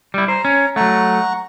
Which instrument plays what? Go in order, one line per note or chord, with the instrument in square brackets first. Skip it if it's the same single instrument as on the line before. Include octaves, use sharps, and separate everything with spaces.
[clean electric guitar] G3 E4
[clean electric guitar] C5 [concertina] A#5
[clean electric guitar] C#4
[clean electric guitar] F#3 A3 [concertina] F#5 A#5 C#6